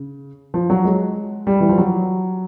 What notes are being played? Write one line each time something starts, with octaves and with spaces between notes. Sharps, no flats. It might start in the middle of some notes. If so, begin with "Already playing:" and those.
Already playing: C#3
F3
F#3
G#3
G3
E3
F3
F#3